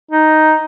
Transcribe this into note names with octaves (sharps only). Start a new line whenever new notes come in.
D#4